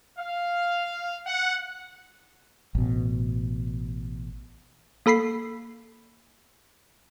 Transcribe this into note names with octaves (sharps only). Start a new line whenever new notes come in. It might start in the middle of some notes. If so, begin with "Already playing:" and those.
F5
F#5
A1 B2
A#3 A4 B5 B6 C7